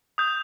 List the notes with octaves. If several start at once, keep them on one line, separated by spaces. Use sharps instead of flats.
D#6 G6